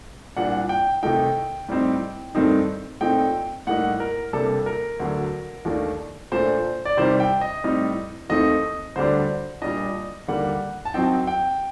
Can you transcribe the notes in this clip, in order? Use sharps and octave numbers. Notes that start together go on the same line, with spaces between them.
C2 A#2 G3 D4 F#5
G5
C3 D#3 A3 D#4 G5
A2 G3 C4 D#4
G2 D#3 A3 C4 D#4
A#2 A3 C4 D#4 G5
A2 G3 A#3 D#4 F#5
A#4
C3 G3 A#3 D4 A4
A#4
D2 D3 F#3
D#2 D#3 A3 D4
A#2 A3 D4 C5
D5
C3 D#3 G3 C5
G5
D#5
A2 G3 C4 D#4
D#2 D#3 A3 C4 D#4 D#5
D2 D3 G3 D4 C5
A#2 G3 D4 D#5
D#2 D3 G3 A#3 F#5
A5
F#2 F#3 C4 D#4 G5
G5